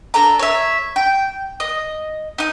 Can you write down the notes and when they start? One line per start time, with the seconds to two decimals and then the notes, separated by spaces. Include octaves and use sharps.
0.14 D4 A4 A#5
0.39 C#5 E5
0.96 G5
1.60 D#5
2.38 D#4 D#6